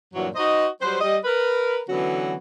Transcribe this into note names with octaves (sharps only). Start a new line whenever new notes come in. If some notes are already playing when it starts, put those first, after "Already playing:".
G2 A#2 E3 F#3
D#4 F#4 C5 D#5
F#3 G3 B4 C5
G3 D#5
A#4 B4
D3 E3 F#3 B3 C#4 F#4